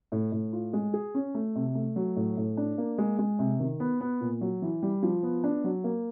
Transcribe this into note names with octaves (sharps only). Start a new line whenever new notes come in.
A2
A2
F4
G#3
G#4
C#4
A3
C3
A3
F#3
A2
A2
D4
A#3
G#3
G#3
C3
D#3
B3
B3
A#2
F#3
E3
G3
F3
B3
D4
F#3
A#3